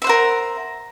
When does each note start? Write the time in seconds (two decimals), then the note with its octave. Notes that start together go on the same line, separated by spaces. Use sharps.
0.02 E5
0.04 C5
0.07 F#5
0.09 A#4